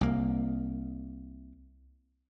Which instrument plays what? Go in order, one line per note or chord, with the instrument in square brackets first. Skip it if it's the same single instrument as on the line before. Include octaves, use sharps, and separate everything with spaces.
[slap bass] C2 A#3